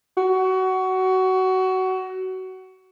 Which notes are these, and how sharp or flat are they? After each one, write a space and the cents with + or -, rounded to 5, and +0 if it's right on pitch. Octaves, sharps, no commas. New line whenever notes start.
F#4 +20